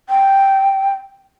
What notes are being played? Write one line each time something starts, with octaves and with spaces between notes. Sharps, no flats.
G5